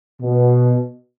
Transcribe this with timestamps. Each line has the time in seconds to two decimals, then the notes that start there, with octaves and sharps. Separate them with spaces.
0.22 B2